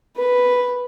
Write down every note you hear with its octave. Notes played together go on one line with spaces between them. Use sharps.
B4